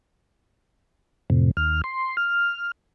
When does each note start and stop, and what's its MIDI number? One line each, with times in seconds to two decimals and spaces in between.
1.30 1.51 41
1.30 1.51 45
1.30 1.51 48
1.57 1.81 39
1.57 1.81 89
1.84 2.17 84
2.17 2.72 89